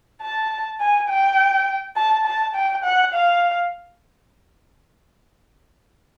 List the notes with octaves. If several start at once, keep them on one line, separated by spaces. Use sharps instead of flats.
A5
G#5
G5
A5
A5
G5
F#5
F5